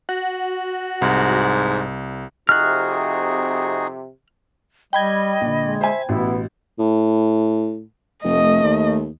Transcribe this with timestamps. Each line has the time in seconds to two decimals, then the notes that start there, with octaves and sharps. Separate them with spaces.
0.09 F#4
1.02 C2 G#2
2.49 F2 C3 D#4 F#4 G#4 F6 F#6
4.93 G3 D#5 G5 B5 G#6
5.41 A#1 D3
5.61 G#3
5.81 C5 E5 G#5
6.09 A1 B2 B3 E4
6.79 A2
8.24 F1 A3 D#5
8.64 D#2